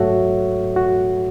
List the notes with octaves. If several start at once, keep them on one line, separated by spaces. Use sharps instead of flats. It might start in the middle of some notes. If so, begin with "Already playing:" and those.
Already playing: G#2 F#3 A3 F#4 A4 C#5 E5
F#4